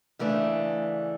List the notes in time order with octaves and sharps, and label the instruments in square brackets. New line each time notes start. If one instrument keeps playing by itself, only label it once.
[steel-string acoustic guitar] C#3 E3 A3 D4